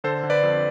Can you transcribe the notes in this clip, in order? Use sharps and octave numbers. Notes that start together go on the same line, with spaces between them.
D3 A4 C5
D3
B4 D5
F2